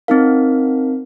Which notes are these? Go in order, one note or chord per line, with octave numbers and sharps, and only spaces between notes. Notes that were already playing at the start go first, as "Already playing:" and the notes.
C4 D#4 A#4 F5